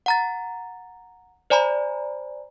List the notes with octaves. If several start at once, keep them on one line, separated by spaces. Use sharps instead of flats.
F#5 A#5 A6
C5 D5 G#5 A#5 B5